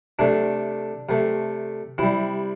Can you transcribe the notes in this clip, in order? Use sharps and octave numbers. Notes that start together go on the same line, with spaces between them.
C3 A3 D4
C3 A3
C3 G3 E4